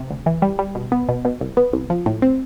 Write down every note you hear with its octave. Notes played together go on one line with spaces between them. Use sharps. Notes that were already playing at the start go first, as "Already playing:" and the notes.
Already playing: C3
D2
E3
G3
G3
B2
B3
B2
B2
C2
B3
C2
F3
A2
C4